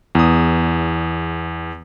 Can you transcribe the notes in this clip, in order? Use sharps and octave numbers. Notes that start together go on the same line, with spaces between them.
E2 D#6